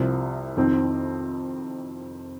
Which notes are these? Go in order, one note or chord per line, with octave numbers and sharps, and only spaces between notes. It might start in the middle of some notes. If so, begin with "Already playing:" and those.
Already playing: C2 C3 F3
F2 D#3 C4